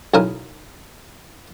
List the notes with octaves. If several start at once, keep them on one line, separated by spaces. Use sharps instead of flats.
B1 C#3 E4 A#4 D#5 D#6